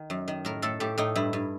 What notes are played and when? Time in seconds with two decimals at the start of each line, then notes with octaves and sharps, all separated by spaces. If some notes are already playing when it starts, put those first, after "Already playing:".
Already playing: D#3
0.10 F#2
0.28 D#3
0.45 A2 A#4
0.62 A2 A4
0.80 A2 G4
0.98 A2 D#4
1.15 G2 E4
1.33 G2